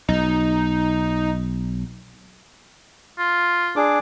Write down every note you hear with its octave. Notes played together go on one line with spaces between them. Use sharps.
B1 D#4
F4
D4 G#4 D6